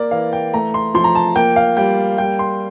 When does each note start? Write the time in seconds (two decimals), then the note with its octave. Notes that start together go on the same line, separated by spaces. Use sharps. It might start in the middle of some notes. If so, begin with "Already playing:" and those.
Already playing: A#3 A#4 D5
0.11 E3 F5
0.33 G5
0.53 A3 A#5
0.74 C6
0.94 F3 C6
1.04 A#5
1.15 A5
1.36 A#3 G5
1.56 F5
1.77 G3 G5
2.18 G3 G5
2.39 C6